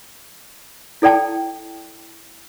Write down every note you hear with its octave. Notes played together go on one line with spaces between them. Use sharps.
E4 A4 D5 G5 A5